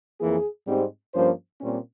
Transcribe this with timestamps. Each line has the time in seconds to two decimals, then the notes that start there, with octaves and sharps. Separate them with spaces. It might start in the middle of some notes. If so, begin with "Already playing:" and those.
0.20 F2 E3 A#3 G#4
0.66 G#2 G3 C4
1.14 G2 F3 A#3 C#4 C5
1.60 A#2 G3 C4 C#4